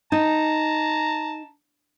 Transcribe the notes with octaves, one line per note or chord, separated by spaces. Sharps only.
D#4 A5 A#5